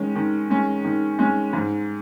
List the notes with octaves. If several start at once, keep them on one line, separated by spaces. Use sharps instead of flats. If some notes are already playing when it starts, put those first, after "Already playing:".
Already playing: D#3 G#3 C#4
D#3
G#3 C#4
D#3
G#3 C#4
G#2